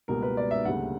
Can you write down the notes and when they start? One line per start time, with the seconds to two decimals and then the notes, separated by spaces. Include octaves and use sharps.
0.08 C#2 B2 G3 A#3 A#4
0.23 B4
0.37 D5
0.51 E5
0.65 D2 C#3 G3 A#3 F#5